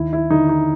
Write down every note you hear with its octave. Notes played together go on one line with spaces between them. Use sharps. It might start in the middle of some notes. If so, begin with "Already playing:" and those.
Already playing: D#2 E4
E4
D3 D#4
D#4